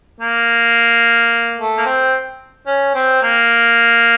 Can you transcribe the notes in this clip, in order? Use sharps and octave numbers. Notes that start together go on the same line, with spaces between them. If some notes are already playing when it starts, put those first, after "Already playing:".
A#3
A3
A#3
C4
C#4
C4
A#3